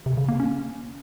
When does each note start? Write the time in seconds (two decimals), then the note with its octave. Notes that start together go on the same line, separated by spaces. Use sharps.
0.06 C3
0.17 C#3
0.28 A#3
0.40 C#4